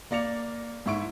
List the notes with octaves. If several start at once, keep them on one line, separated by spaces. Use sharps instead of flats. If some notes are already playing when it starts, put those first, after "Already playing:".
A#3 D5 A#6 C#7 F7
G#2 E4 C#6 D7